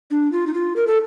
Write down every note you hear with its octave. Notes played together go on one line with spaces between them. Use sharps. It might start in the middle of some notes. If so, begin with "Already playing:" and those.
D4
F4
D#4
F4
A#4
A4